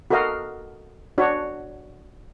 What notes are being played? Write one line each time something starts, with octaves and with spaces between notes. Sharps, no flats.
F#4 A4 A#4 D#5 F5
D4 F#4 C#5